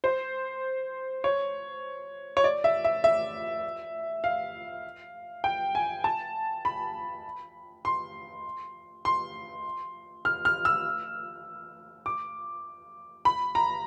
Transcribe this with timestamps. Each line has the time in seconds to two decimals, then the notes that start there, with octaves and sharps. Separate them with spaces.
0.04 C5
1.24 C#5
2.37 C#5
2.44 D5
2.64 E5
2.84 E5
3.04 E5
4.24 F5
5.44 G5
5.75 G#5
6.04 A5
6.65 B5
7.85 C6
9.05 C6
10.25 F6
10.45 F6
10.65 E6
12.06 D6
13.25 B5
13.55 A#5